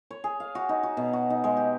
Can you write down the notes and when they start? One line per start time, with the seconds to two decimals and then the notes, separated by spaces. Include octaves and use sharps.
0.11 C#5
0.24 G#4
0.40 F5
0.55 F#4
0.69 D#4
0.83 F#4
0.97 B2
1.13 F#4
1.30 D#4
1.44 G#3
1.57 G4